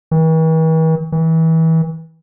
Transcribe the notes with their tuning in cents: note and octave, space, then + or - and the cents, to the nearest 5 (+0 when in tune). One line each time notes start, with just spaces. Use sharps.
E3 -45
E3 -30